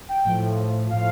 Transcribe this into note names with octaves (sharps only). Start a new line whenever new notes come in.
G5
A2 F3
A2 F3 F5